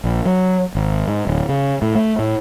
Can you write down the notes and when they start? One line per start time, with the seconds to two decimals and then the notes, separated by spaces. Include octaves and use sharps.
0.04 A#1
0.25 F#3
0.75 G#1
1.08 G#2
1.27 D1
1.49 C#3
1.82 A2
1.95 A3
2.19 A2